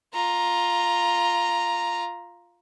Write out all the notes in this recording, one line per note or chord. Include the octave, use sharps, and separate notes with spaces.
F4 A#5